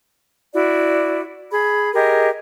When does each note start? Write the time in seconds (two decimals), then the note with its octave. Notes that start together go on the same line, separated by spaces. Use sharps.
0.53 E4 F#4 D5
1.51 G#4 B5
1.93 G4 G#4 A#4 D#5